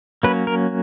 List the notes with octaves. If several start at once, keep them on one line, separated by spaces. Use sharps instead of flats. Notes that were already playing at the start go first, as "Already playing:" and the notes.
F#3 A#3 C#4 B4
A#4